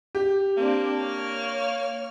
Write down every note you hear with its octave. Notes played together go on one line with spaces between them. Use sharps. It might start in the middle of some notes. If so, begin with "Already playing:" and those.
G4
A#3 C4 D4
C#5 F6